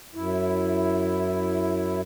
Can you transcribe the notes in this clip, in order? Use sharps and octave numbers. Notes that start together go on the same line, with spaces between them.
F#2 E4